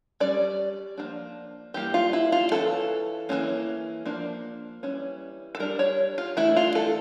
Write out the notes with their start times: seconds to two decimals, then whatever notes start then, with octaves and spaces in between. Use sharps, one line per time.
0.20 G3 C#4 D5
0.98 F3 A#3 D4
1.74 E3 G3 A#3 G4
1.94 F4
2.13 E4
2.32 F4
2.52 E3 G3 C#4 A4
3.29 E3 G3 A#3 C#4
4.05 F3 A#3 D4
4.83 E3 G3 C#4
5.55 A4
5.60 G3 D4 A#4
5.79 C#5
6.18 F4
6.37 E3 A3 D4 E4
6.56 F4
6.75 A4